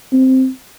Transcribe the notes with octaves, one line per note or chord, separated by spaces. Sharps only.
C4